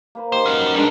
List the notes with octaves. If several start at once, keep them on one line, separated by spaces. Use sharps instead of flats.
A#3 B4 C5
D#3 A#3 G4 C5
C#4 F#4 B4
G3 G#3 D4 A#4